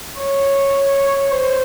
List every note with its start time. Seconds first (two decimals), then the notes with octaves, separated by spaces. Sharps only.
0.21 C#5
1.31 C5